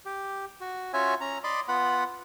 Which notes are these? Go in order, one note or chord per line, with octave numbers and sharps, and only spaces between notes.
G4
F#4
C#4 F4 F#4 C#5 E5 G#5
C#4 A#5
D5 D#5 B5 C6 D6
B3 F4 F#5 B5